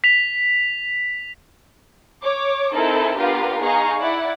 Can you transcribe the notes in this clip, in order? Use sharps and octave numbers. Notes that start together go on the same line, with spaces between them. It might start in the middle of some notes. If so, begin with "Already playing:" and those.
B6 F7
C#5 D6
C4 D#4 E4 A4 A#4
B3 D4 F4 G4 A#4 F5
D#4 G#4 F5 A#5 C#6
E4 D5 F#5